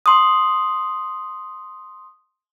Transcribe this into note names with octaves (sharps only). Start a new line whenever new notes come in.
C6 D#6